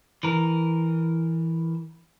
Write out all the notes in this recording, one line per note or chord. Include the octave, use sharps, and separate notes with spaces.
E3 A#4